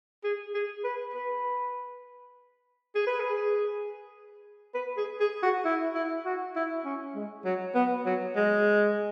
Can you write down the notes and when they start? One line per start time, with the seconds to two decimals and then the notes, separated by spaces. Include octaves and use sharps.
0.23 G#4
0.54 G#4
0.84 B4
1.14 B4
2.95 G#4
3.07 B4
3.20 G#4
4.74 B4
4.97 G#4
5.20 G#4
5.42 F#4
5.65 E4
5.94 E4
6.25 F#4
6.55 E4
6.85 C#4
7.15 G#3
7.45 F#3
7.75 B3
8.06 F#3
8.35 G#3